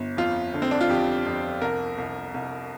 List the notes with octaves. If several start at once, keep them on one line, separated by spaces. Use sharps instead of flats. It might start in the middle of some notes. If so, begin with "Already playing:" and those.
Already playing: G1
F2 F4
D3
C4
D4
F4
F2 G4
F2
C2 A#4
C2
C2